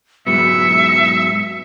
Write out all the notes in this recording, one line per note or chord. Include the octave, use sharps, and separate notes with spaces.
G#2 F#3 B3 E5 C#7